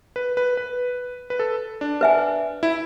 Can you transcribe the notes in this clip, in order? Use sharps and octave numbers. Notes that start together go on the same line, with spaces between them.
B4
B4
B4
B4
A4
D4
B4 E5 G#5
E4